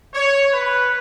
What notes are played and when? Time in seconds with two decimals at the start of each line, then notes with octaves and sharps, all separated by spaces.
0.14 C#5
0.53 B4